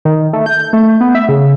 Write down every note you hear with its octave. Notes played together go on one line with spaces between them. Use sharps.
D#3
A3
G6
A3
B3
E5
C#3